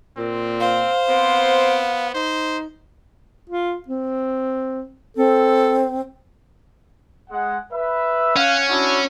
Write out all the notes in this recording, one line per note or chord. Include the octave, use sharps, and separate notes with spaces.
A#2 C4
C5 F5
B3 C4
D#4 C5
F4
C4
C4 A4
G#3 F#5
B4 E5
C#4 F5 F#5
D4 E4 F#4